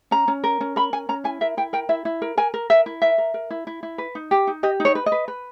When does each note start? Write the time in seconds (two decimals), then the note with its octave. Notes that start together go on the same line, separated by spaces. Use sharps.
0.11 C#4 A#5
0.28 C#4
0.44 A#4
0.61 C#4
0.76 A#4 B5
0.93 C#4 G#5
1.09 C#4 A#5
1.24 E4 G#5
1.41 A#4 E5
1.57 E4 G5
1.73 A#4 G5
1.89 E4 E5
2.05 E4
2.22 A#4
2.37 A#4 G#5
2.54 A#4
2.70 A#4 E5
2.86 E4
3.02 A#4 E5
3.18 A#4
3.34 A#4
3.51 E4
3.67 E4
3.83 E4
3.98 B4
4.15 D#4
4.31 G4
4.47 D#4
4.63 G4 D#5
4.80 D#4
4.85 C#5
4.95 B4
5.06 D#5
5.12 B4
5.28 B4